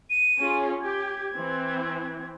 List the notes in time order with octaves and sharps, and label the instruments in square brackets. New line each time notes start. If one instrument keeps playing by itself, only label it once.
[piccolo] D#7
[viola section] C#4 F4 G#4
[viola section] G4 [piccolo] G#6
[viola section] E3 C4